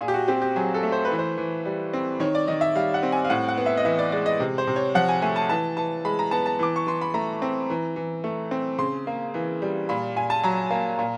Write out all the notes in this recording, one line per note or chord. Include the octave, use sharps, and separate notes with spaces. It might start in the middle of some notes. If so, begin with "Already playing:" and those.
A#2 G#4
G4
F#4
C4 G4
G4
F#3 G#4
A4
A3
C5
B4
E3
C5
E3
G3
C4
D#3 C#5
D5
D#3 D#5
E5
G3 F5
F#5
C4
G#5
F5
A2 F#5
F#5
B3
E5
D#5
E3 E5
D5
G#3 D5
D#5
C3
C5
C3
C#5
F3 F#5
G#5
A3 G#5
A5
E3 A5
E3 A5
G#3 B5
A#5
B3 A5
A5
E3 D6
C#6
E3 C6
B5
A3 A#5
C4
E3
E3
A3
C4
C#3 C6
A#3
E3
G3
A#2 B5
A#2 G#5
A5
F#3 A#5
A#3
A#2